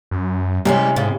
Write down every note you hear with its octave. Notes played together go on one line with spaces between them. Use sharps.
F#2
C3 E3 G3 G#3 C#4
G#2 C#3